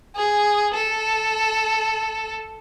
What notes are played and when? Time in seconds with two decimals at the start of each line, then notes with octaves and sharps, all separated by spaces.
0.16 G#4
0.74 A4